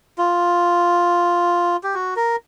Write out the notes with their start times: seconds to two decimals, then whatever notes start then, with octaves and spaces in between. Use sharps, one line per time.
0.18 F4
1.83 G4
1.94 F#4
2.16 A#4